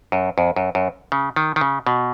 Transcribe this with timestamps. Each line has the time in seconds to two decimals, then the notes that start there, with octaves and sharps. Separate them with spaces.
0.12 F#2
0.38 F2
0.56 F#2
0.75 F#2
1.12 C#3
1.36 D#3
1.56 D#3
1.61 C#3
1.87 B2